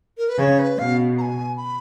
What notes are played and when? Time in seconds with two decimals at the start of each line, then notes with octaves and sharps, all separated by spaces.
0.18 A#4
0.29 B4
0.39 C#3 C#5
0.59 B4
0.79 B2 F5
1.18 A#5
1.21 G#5
1.57 B5